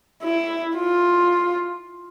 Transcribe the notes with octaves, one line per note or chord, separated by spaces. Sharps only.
E4
F4